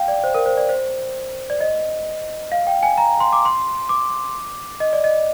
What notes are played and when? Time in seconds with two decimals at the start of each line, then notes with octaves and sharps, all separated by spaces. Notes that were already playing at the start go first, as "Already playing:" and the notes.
Already playing: F5 G5
0.08 D5
0.24 C5
0.35 A#4
0.46 C5
0.57 D5
0.69 C5
1.50 D5
1.61 D#5
2.52 F5
2.67 G5
2.83 G#5
2.98 A#5
3.20 C6
3.33 D6
3.45 C6
3.89 D6
4.80 D#5
4.93 D5
5.04 D#5